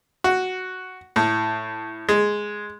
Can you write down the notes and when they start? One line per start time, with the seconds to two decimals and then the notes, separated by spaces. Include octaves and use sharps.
0.24 F#4
1.16 A2
2.09 G#3